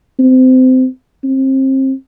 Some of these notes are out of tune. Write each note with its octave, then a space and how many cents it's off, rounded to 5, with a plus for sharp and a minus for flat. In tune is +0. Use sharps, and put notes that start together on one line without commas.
C4 -25
C4 +30